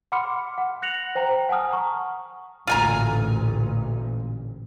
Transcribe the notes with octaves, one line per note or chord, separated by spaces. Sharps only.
F#5 B5 C6 D6 F6 C#7
F#5
F#6 A#6 C#7 F7 F#7
C5 G5 A#5
F#5 G#5 A5 D#6 F6
A#5 C#6
A1 D2 A#2 F4 G#5 A#5